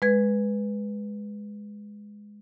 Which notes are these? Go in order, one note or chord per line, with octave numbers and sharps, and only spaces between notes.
G#3 B4 G#6